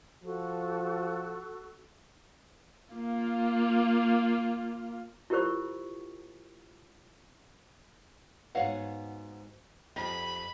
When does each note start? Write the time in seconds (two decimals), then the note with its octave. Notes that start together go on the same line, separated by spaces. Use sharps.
0.23 F3 F#4 A4
2.94 A#3 F4
5.30 E4 F4 G4 A#4 C5 C#6
8.55 G#2 B3 F#4 C#5 F5 F#5
9.96 F2 F4 G4 D#5 B5